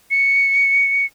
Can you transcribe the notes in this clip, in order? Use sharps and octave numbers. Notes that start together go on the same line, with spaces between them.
C#7